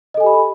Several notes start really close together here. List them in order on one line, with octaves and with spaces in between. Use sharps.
D#5 A4 G#5 G4 B5